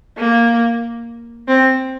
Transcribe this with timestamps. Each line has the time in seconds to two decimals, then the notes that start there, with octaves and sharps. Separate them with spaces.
0.18 A#3
1.48 C4